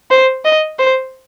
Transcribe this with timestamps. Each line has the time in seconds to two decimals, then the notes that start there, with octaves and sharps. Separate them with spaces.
0.11 C5
0.45 D#5
0.79 C5